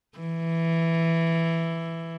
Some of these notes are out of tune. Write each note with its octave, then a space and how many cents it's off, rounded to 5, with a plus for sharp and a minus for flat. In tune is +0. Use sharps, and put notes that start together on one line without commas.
E3 +5